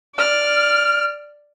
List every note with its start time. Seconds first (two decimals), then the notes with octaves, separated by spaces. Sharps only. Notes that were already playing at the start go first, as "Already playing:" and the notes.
0.15 D5 F6